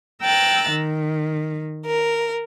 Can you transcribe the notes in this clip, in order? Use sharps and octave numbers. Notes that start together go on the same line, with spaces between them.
G5 A#5 E6 F#6 A6
D#3
A#4